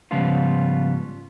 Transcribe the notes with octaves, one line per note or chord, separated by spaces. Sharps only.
G#2 C#3 F3 G3 B3 F4